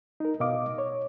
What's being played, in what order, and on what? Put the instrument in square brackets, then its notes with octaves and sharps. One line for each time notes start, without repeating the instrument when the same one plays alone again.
[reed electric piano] D#4 A#4
B2 D#5 F5 D6
C#5